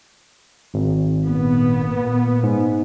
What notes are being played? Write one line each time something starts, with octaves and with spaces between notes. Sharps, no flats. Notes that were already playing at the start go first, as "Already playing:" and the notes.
G#1
A#2 B3
G#2